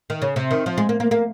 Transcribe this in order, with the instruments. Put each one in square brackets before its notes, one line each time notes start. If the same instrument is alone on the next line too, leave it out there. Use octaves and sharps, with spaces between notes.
[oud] D#3
C#3
C3
D#3
F3
G#3
A#3
A#3
A#3